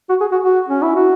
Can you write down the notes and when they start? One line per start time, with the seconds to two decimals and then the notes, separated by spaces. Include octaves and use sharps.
0.10 F#4
0.21 G#4
0.32 F#4
0.43 F#4
0.69 C#4
0.83 E4
0.95 F#4